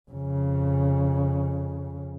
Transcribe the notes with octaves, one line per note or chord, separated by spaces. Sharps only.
F2 C#3